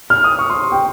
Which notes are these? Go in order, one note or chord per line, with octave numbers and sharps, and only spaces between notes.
F6
D#6
C#6
C6
G5